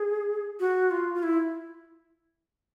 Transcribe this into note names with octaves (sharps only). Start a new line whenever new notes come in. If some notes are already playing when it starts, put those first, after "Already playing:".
Already playing: G#4
F#4
F4
F4
E4